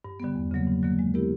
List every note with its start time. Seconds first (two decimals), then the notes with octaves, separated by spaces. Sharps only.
0.05 G2
0.20 D3 G3 B3
0.35 E2
0.51 C#3 F#3 A#3
0.67 G2
0.83 D3 F#3 A#3
0.99 G#3
1.14 B3 E4 G4 A#4